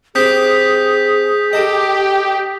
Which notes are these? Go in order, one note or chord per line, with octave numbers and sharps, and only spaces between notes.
C4 G4 G#4 D#6 G6 B6
G4 A4 D#5